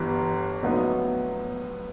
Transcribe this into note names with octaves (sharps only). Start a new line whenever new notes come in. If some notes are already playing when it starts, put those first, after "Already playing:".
Already playing: G1 G2 E3
A#1 A2 F#3 B3 D#4